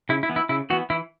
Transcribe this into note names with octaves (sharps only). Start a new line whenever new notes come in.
C#3 E4
E4
E3 B3
E4
C#3 E4
E3 B3 F#4
E3 E4